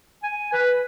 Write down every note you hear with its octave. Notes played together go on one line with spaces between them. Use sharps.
G#5
B4